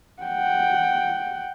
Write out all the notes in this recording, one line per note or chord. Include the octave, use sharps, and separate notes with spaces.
F#5 G5